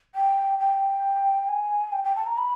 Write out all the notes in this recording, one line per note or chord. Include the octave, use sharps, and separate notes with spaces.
G5
G5
G#5
G5
G5
A5
A#5
B5